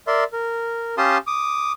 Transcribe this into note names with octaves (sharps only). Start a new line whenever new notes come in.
A#4 D5 E5 C6
A#4
C#4 G4 F5 A5 C6 D#6
D6 D#6